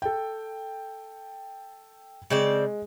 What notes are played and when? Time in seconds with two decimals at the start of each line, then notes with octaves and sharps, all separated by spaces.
0.02 A4 G5
2.30 C#3 G#3 C4 D5